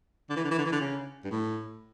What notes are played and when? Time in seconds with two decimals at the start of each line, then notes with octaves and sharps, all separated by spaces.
0.30 D3
0.36 E3
0.44 D3
0.51 E3
0.59 D3
0.66 E3
0.72 D3
0.80 C#3
1.24 G2
1.31 A2